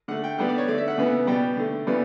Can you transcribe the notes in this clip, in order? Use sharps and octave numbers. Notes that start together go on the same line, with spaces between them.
D3 A3 F#5
G5
D3 G3 B3 F#5
D5
C#5
D3 A3 D5
E5
F#5
C#3 E3 B3
B2 G3 B3 G5
D3 A3
C#3 E3 G3 B3